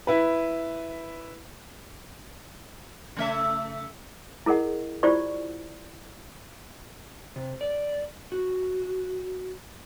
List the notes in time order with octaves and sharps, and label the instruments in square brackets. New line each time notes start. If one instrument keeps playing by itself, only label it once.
[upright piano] E4 B4
[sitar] C#3 A3 E5
[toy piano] E4 G#4 A#4 D#5 F#5
E4 F4 G4 C5 D5 C#6
[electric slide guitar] C3
D5
F#4